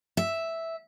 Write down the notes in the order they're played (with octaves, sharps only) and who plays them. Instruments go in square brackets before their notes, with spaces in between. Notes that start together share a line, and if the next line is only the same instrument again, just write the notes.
[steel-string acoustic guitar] E5